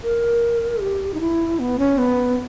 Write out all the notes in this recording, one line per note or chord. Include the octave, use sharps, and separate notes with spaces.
A#4
G4
D#4
E4
B3
C#4
B3